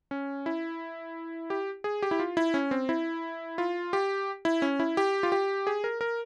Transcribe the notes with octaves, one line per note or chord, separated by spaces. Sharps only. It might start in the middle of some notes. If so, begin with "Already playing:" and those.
C#4
E4
G4
G#4
G4
E4
F4
E4
C#4
C4
E4
F4
G4
E4
C#4
E4
G4
F4
G4
G#4
A#4
A#4